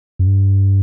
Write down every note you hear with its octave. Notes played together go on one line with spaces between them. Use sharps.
F#2
G2